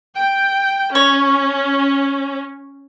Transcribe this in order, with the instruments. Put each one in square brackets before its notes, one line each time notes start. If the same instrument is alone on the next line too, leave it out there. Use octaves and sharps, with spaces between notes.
[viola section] G5
[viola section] C#4 [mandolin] C#5